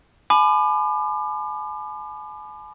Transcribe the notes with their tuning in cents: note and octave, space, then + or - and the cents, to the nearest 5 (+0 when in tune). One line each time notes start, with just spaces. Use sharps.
G#5 +35 B5 +25 D6 +35